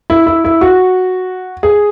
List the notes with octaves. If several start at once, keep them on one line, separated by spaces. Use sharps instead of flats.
E4
E4
E4
F#4
G#4